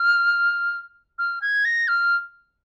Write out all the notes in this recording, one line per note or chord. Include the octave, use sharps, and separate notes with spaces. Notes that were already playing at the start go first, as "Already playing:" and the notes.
Already playing: F6
F6
G#6
A#6
F6